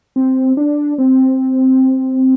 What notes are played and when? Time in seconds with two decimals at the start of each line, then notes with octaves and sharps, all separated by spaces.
0.16 C4
0.57 D4
0.98 C4